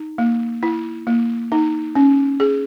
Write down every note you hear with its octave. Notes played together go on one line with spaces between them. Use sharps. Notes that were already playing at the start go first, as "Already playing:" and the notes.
Already playing: D#4
A#3
E4
A#3
D#4
C#4
G#4